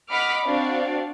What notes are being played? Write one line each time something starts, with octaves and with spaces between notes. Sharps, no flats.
D#5 F#5 B5 D6 F6 B6
C4 D4 F#4 D5 F5